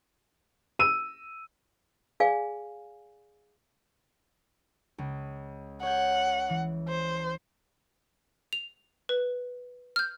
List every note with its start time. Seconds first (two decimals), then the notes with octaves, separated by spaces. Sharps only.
0.79 E6 D#7
2.20 G#4 D5 F5 G#5
4.98 C#2
5.83 C#5 F#5 G6
6.50 E3
6.89 C5
8.53 F7
9.09 B4
9.96 F6 G6